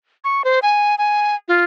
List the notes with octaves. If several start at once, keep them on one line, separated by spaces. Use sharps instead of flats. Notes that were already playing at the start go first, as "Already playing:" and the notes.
C#6
C5
G#5
G#5
F4